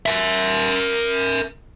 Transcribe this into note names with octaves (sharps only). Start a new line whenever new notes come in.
A#4 E5